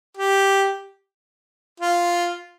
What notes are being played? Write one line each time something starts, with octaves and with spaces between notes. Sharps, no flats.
G4
F4